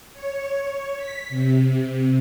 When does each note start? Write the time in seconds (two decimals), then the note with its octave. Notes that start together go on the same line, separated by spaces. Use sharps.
0.13 C#5
0.97 B6
1.29 C3